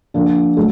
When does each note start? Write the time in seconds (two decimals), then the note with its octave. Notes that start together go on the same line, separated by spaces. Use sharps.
0.14 D3 F3 A#3
0.57 F#3 A3